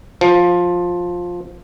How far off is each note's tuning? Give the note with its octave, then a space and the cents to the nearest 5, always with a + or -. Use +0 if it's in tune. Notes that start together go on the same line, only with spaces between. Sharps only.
F3 +10